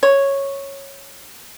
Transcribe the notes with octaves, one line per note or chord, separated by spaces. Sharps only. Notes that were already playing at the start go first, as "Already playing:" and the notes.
C#5